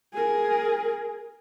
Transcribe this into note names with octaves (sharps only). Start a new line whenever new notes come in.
G#4 A#4